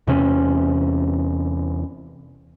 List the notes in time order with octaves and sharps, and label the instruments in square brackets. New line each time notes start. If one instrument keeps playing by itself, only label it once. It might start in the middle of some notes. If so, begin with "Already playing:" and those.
[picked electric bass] E2 C3 C#4